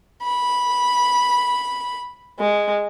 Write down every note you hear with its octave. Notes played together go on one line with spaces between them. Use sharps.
B5
G#3